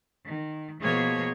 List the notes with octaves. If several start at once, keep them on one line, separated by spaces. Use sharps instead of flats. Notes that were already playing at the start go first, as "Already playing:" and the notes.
D#3
B2 F3 A#3 G#4 C#5 G#6